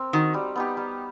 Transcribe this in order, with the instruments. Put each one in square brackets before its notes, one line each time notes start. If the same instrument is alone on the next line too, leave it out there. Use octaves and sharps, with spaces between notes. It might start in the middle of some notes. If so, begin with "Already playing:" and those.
Already playing: [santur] C4 A#4
[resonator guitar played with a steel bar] D#3 [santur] D#4 F#4
[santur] G3
B3 D#4 G4
G3